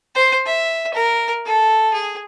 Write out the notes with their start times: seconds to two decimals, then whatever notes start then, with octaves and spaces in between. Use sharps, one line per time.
0.15 C5
0.46 E5
0.94 A#4
1.46 A4
1.93 G#4